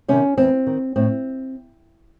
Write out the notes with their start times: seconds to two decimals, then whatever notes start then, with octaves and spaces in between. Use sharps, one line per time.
0.08 C3 D#3 C#4
0.38 E2 C4
0.67 D#3
0.96 A2 C4